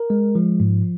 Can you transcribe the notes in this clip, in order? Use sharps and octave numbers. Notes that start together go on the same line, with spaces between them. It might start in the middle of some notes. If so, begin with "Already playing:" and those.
Already playing: A#4
G#3
F3
G#2